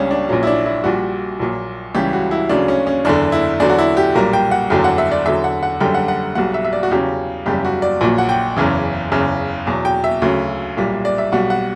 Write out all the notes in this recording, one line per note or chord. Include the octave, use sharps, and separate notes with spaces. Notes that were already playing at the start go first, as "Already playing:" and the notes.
Already playing: C#2 C#3 G3 C#4 D4
D4
A#1 A#2 F#3 C#4
E4
D4
E4
A#1 A#2 G3 F#4
A#1 A#2 F#3
C#2 C#3 E3 G3 G4
F#4
E4
D2 C#3 F#3 D4
C#4
C#4
F#1 E2 D3 D4
E4
E2 D3 F#3 D4
F#4
E4
G4
B1 A#2 G3 A#4
G5
F#5
F#1 E2 D3 F#3 G5
F#5
E5
D5
E2 D3 F#3 E5
F#5
F#5
F#1 F#2 D3 G3 G5
F#5
F#5
B1 B2 G3 F#5
E5
E5
D5
F#4
E2 C#3 F#3 G4
F#1 E2 C#3 G3 G4
F#4
D5
A#1 A#2 F#3
F#5
G5
F#1 E2 C#3 E3
F#1 E2 C#3
E2 B2 F#3
G5
E5
D2 C#3 F#3
B1 A#2 G3
D5
E5
B1 B2 G3 F#5
F#5